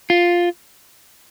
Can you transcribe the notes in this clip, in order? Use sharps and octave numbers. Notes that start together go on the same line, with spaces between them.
F4